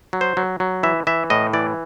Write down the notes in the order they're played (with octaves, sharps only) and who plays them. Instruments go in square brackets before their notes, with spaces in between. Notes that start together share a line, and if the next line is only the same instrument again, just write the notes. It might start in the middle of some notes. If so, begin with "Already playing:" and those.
[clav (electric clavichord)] F#3
C5
F#3
F#3
E3 E5
E3 E5
A2 D#5
E3 D5